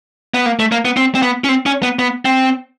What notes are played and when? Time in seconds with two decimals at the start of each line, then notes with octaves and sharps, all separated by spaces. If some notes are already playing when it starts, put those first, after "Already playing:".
0.34 B3
0.46 A#3
0.59 A3
0.72 A#3
0.85 B3
0.97 C4
1.15 C4
1.22 B3
1.44 C#4
1.49 C4
1.66 C#4
1.83 B3
1.99 B3
2.25 C4